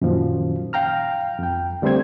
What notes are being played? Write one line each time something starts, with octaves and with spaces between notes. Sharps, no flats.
F#2 A#2 D#3 F3
F5 G5 A#5 F6
F2 G5
D3 G3 A3 C4 C5 G#6